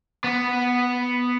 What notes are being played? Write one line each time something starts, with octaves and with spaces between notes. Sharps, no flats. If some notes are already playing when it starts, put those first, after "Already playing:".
B3